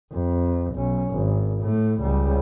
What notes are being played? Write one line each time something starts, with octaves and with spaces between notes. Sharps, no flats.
F2
B1 C#4
G#1
A2 A3
C#2 G3